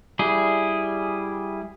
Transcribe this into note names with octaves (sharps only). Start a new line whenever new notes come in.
G3 E4 G#4